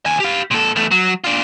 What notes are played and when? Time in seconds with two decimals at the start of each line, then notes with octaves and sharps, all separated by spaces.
0.06 D#2 G#5
0.20 G4 F5
0.51 A#2 A4
0.76 E2 A3
0.91 F#3
1.24 D4 F4